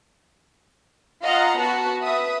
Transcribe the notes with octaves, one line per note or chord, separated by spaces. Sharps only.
F4 D#5 F5 F#5 A#5
B3 F#4 B4 F#5 A5
B4 E5 D#6